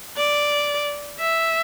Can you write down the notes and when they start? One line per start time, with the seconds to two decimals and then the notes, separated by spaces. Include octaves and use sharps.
0.18 D5
1.19 E5